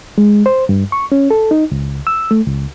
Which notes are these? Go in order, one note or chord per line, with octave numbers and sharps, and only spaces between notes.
G#3
C5
G2
C#6
C#4
A4
D#4
C#2
E6
A3
C#2